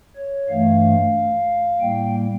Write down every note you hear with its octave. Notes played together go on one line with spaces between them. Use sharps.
C#5
G2 E3 A3 F5
A2 G3 A#3 G5